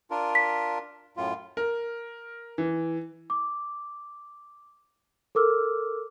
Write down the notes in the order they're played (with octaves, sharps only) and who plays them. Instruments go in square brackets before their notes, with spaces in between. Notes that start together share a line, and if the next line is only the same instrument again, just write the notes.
[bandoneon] D4 F4 A#4
[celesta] B6
[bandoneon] F#2 A2 F4
[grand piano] A#4
E3
[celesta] D6
A4 A#4 D6 E6 F6